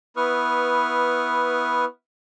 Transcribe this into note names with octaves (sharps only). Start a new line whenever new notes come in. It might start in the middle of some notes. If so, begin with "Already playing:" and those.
B3 E4 B4 C#6 D#6 F6